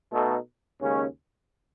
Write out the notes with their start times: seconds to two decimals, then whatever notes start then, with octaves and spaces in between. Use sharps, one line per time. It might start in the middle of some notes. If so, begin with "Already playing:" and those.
0.12 B2 A3 D#4 A4
0.81 D#2 C#3 G#3 C#4